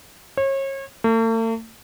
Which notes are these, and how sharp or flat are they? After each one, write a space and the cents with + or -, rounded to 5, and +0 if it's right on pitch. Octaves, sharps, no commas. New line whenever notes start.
C#5 -35
A3 +45